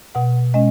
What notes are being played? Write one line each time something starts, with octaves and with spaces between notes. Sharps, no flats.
B2 F#5
G#3 C#4 D#5